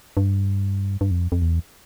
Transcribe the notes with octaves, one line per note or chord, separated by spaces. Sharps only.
G2
G2
F2
F2
E2